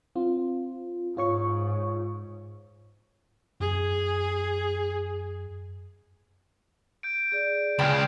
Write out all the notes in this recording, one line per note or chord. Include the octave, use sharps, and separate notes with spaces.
C4 F4
G#2 F4 C#5 C#6
F#2 G#4
G6 D7
G#4 D5
C#2 C#3 G5 B5 F6 G#6 E7